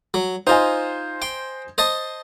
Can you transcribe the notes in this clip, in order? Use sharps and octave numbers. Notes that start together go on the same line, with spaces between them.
F#3
D#4 F4 C5 D#5 G#5
G5 C6
C5 D#5 A5